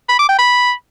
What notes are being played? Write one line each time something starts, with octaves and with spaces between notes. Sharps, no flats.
B5
D6
G5
B5